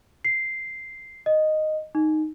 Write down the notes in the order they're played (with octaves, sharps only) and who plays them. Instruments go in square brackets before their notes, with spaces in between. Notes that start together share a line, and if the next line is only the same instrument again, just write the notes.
[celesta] C7
D#5
D#4